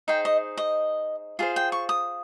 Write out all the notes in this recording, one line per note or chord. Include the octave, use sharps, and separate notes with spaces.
D#4 G#4 C5 G5
D#5
D#5
F4 G#4 C5 F5
G5
C#6
D#6